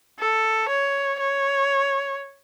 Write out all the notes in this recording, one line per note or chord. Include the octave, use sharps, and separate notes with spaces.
A4
C#5
C#5